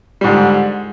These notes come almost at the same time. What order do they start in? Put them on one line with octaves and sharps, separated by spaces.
G3 G#2 D3